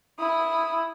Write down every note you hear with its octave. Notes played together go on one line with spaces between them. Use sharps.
E4 D#6